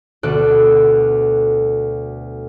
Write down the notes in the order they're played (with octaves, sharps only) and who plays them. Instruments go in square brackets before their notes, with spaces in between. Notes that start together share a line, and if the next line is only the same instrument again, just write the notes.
[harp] D2 B2 A4 D5 F#6